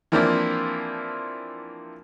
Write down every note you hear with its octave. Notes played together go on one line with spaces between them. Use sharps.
E3 F3 A#3 C4 D4 E4